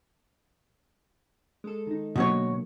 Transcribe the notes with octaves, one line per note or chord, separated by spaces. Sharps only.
G#3 A4
D#3 D#4
B2 D3 F#3 A#3 F#4 C#5